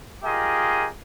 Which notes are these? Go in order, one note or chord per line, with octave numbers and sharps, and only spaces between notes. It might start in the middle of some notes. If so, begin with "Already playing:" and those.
F4 G4 G#4 A#4 D#5